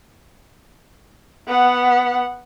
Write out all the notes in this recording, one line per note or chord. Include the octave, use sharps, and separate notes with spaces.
B3 F#5